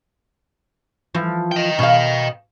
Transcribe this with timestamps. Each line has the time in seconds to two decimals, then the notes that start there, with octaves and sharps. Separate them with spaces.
1.15 E3 F3
1.52 D#5 G5
1.79 B2 F5